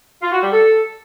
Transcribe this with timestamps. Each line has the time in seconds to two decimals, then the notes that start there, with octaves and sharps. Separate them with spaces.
0.22 F4
0.32 F#4
0.42 G3
0.51 A4